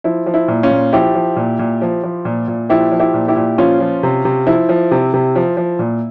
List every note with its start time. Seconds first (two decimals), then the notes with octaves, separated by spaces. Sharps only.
0.04 F3 E4
0.26 F3
0.34 E4
0.48 A#2
0.63 C#4 F4
0.71 A#2
0.93 F3 E4 G4
1.15 F3
1.36 A#2
1.59 A#2
1.82 F3
2.03 F3
2.25 A#2
2.48 A#2
2.69 F3 E4 G4
2.91 F3
3.00 E4 G4
3.14 A#2
3.28 E4 G4
3.36 A#2
3.58 F3 C#4 F4
3.80 F3
4.03 C3
4.25 C3
4.47 F3 E4
4.69 F3
4.91 C3
5.14 C3
5.35 F3
5.57 F3
5.79 A#2